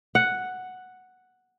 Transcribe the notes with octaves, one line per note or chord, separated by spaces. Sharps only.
F#5